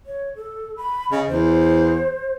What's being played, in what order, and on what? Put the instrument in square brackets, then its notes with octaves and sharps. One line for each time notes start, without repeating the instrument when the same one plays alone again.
[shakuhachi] C#5
A4
B5
[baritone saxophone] C#3 [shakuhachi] D#5
[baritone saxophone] E2 [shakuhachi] C5